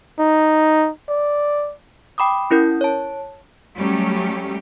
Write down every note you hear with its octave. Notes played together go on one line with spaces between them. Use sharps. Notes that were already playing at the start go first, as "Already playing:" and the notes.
D#4
D5
G5 B5 D6 D#6
C#4 E4 A#4 G6
C#5 A5
F#3 G3 A3 C#4 G4